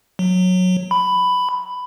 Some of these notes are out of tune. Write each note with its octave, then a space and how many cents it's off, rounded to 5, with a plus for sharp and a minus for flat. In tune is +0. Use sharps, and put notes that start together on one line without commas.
F#3 -15
B5 +10